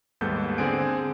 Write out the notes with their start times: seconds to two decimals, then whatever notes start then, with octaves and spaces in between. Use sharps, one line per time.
0.21 D#2 G#2 G3 B3 A4 G6
0.58 D3 C4 G#4 G#5 D7